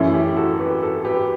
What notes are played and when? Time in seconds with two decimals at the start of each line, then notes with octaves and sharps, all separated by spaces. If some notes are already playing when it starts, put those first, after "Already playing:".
Already playing: F#2 E3 A3 C#4 E4
0.14 E4 G4
0.36 F#4 A4
0.60 G4 B4
0.83 F#4 A4
1.05 G4 B4